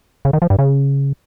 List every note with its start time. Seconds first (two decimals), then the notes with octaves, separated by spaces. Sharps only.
0.25 C#3
0.33 D#3
0.42 F3
0.50 G2
0.59 C#3